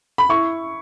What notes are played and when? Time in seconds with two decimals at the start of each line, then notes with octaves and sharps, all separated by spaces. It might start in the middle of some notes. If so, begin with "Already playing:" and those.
0.18 B5
0.29 E4 C#6